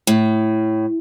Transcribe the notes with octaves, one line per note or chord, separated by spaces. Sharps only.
A2